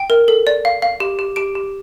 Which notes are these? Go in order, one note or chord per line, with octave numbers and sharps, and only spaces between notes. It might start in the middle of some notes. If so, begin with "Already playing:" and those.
Already playing: G5
A#4
A4
D5
F5
F5
G4
G4
G4 D7
G4